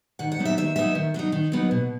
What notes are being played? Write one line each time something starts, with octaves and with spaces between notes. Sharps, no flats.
D#3 F#5
F#5
F#3 B3 D#4
E5
D#3 E5
F#3 B3 D#4 E5
D#3
F#3 B3 D#4
D#3
F#3 B3 D#4
B2